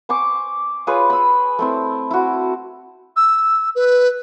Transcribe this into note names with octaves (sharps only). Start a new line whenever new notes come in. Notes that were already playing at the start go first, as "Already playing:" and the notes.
C5 G#5 C#6 D6
F4 G#4 B4 C#5
B5 E6
A3 C4 E4
E4 F#4
E6
B4